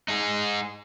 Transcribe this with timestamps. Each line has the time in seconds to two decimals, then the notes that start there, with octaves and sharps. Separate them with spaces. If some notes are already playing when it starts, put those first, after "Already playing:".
0.08 D#4 G#4